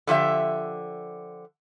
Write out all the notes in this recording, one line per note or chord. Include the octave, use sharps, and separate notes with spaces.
D3 F3 G4 E5